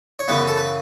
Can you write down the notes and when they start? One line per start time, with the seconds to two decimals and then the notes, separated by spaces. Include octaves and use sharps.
0.19 C#5
0.28 F#2 C#3 E3 B3 B4
0.47 A4
0.57 B4